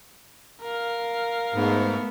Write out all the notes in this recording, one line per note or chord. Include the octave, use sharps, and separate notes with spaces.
A#4 F5
G#2 A3 B3